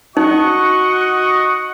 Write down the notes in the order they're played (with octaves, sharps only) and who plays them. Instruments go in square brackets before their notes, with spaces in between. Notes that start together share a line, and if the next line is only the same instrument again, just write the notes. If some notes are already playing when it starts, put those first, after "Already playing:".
[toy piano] D#4 [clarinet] F#4 [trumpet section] D#5 F#5 C#6